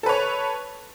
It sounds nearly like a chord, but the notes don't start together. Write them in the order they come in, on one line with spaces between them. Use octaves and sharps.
A4 B4 C#5